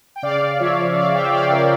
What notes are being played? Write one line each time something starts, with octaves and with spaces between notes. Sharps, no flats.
G5
C#3 D5 F5
F3 C#5 E5
C#3 D5 F5
E5 G5
C#3 D5 F5
A#4 D5